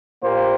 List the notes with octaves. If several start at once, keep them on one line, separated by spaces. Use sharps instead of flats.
A#2 A#3 G4 C5